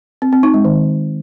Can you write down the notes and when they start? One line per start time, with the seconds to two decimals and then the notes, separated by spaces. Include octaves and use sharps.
0.22 C4
0.33 C4
0.43 D#4
0.54 G#3
0.65 D#3